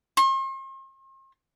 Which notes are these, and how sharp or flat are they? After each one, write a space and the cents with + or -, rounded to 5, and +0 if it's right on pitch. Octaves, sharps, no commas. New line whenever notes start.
C6 +45